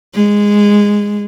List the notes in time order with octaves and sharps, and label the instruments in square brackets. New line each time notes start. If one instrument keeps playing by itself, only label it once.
[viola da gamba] G#3